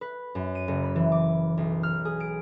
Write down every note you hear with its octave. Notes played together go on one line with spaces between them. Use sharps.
B4
F#2
D#7
F#1
B5
E3
D6
B1
F6
G#4
D7